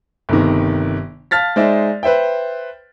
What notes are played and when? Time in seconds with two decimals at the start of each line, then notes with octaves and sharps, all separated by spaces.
0.29 G1 C3 D#3
1.31 F5 A5 F6 A6 B6
1.56 G#3 D#4 C5 D5 E5
2.03 B4 C5 E5 G5